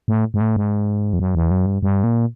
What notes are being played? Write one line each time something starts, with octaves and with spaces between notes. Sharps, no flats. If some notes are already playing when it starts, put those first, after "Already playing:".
A2
G#2
A2
G#2
F2
F#2
E2
F#2
G2
G2
A#2